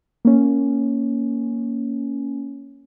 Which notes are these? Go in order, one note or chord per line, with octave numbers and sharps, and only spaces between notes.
A#3 C#4